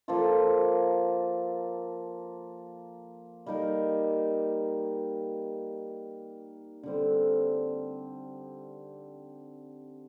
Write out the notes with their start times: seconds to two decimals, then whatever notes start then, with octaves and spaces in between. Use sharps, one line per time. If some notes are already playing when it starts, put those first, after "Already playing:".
0.08 F3 A#3 F4 A4
3.46 G3 A#3 D#4 A#4
6.83 D3 G3 C4